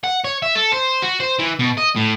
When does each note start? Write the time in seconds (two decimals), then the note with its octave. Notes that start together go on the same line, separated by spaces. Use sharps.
0.04 F#5
0.24 C#5
0.43 E5
0.55 A4
0.72 C5
1.02 F#4
1.20 C5
1.39 E3
1.59 B2
1.77 D#5
1.96 A2